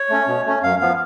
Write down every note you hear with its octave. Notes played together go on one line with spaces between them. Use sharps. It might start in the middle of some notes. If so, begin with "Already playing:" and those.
Already playing: C#5
A3 C#4
B2
A3 C#4
F#2 F5
F3 B3 F5